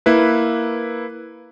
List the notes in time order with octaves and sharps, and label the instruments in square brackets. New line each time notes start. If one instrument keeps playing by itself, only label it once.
[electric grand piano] A#3 E4 B4